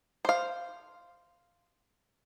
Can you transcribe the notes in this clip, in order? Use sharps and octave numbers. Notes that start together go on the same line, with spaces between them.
C5 F5